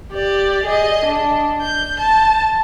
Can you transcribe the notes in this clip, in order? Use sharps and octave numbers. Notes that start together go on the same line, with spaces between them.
G4 D5
G#4 D#5
D4
G6
A5